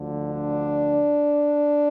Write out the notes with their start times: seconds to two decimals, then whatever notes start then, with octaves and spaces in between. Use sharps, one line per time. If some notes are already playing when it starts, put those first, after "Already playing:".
Already playing: D2 D3 F3
0.29 D4